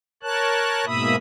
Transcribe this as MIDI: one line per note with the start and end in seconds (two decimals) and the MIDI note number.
0.23 0.85 70
0.23 0.85 73
0.23 0.85 81
0.23 0.85 90
0.86 1.16 44
0.86 1.16 47
0.86 1.16 58
0.86 1.16 76
0.86 1.16 83
0.86 1.16 87